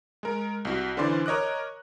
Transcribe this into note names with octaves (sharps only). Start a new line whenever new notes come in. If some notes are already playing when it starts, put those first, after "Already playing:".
G#3 A#4
C2 F#4
D3 E3 C#4 C5 D5 C6
A#4 C#5 D#5 D6 F#6